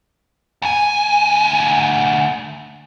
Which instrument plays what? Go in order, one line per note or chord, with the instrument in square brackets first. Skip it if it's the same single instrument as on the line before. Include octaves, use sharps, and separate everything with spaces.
[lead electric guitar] D2 G#5